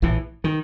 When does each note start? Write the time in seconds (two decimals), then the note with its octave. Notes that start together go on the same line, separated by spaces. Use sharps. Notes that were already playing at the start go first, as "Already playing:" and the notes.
0.02 A#1 A2 E3
0.44 D#3